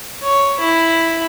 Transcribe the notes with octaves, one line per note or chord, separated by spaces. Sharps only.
C#5
E4 B5